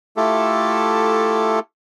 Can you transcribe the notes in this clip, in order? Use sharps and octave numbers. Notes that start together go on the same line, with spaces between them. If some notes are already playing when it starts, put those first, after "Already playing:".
A3 E4 F4 G4 A4